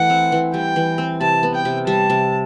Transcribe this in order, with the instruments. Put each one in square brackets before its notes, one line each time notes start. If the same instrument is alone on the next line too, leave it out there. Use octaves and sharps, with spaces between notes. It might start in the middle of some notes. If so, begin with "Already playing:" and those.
Already playing: [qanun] E3 A3 [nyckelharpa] F#5
[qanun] C4
E3
[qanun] G3 [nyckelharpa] G5
[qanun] E3
C4
[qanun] C3 [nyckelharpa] A5
[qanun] B3
[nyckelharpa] G5
[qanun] C3
[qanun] G3 [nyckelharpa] A5
[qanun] C3